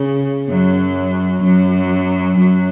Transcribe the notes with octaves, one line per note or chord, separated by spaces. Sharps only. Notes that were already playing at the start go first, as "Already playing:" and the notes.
Already playing: C#3
F#2 F#3
F#2 F#3
F#2 F#3